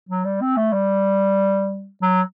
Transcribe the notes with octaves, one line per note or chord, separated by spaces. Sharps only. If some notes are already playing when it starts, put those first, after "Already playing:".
F#3
G3
C4
A3
G3
F#3